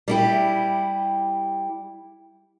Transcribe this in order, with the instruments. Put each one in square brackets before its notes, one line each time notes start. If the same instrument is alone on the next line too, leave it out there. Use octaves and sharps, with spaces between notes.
[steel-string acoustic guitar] G3 E4 G4